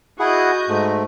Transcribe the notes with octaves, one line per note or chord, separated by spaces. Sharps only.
E4 F#4 G#4 D#5 F#5 G6
G#2 A3